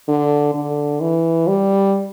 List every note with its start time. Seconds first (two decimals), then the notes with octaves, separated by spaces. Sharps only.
0.08 D3
0.54 D3
1.01 E3
1.48 G3